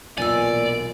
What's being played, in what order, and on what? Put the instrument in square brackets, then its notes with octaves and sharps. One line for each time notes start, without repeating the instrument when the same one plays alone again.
[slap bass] B1 E2 [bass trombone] A#2 [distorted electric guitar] D5 [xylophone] G#5 E6